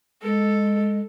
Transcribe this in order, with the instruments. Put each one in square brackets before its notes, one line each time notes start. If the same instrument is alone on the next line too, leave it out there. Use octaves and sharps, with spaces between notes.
[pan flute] G#3 [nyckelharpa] A4